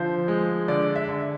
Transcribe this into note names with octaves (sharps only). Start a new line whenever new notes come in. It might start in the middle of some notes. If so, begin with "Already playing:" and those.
Already playing: D3 F3 C5
G#3
D3 D5
E5
D3